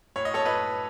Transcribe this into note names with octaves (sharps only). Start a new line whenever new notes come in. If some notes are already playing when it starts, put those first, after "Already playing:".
A2 C#5
D#5
A4 C#5
A2 B4 D#5